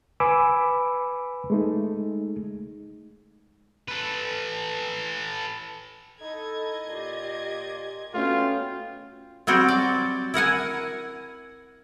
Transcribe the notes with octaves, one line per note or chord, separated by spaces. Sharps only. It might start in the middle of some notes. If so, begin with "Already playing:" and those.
B4 G#5 B5 D6 E6
G#3 A3 D#4
A4 B4
D#4 E4 A4 D#5 G#6
A#2 F4 G4
A3 B3 C#4 F4 F#4 G5
F#3 G3 C4 F#4
D5
E4 A#4 F#5 G#5